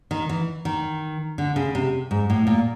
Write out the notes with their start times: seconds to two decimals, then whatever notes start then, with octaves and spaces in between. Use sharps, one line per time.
0.11 D#3
0.29 E3
0.65 D#3
1.38 D3
1.56 C#3
1.75 C3
2.11 G#2
2.30 A2
2.47 A#2